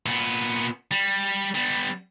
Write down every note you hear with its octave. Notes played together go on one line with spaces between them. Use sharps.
A#2 B3
G3
G3 B3